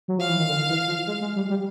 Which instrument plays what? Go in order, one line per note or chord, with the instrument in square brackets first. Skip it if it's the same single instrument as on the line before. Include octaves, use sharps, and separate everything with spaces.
[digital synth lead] F#3
[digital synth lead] F3 [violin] F5
[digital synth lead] E3
D#3
D3
E3
F3
G#3
G#3
G3
G3